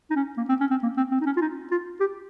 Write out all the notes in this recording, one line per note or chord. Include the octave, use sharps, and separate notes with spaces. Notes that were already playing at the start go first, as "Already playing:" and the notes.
D#4
C#4
A#3
C4
C#4
C4
A#3
C4
C4
D#4
C#4
F4
D#4
F4
G4